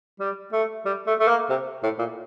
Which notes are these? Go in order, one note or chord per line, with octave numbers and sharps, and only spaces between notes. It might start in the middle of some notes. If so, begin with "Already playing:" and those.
G3
A3
G3
A3
A3
A#3
C3
A2
A#2